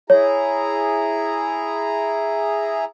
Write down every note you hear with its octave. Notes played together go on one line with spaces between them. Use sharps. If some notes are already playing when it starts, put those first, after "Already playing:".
E4 G#4 C#5 A#5